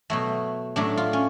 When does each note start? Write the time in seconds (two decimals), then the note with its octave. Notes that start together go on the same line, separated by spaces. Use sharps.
0.10 B2 F#3 A3
0.76 A2 F#3 A3 D4
0.97 F4
1.13 C#4